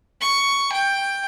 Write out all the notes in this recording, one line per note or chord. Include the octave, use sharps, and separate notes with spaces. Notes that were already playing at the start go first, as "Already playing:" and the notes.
C#6
G5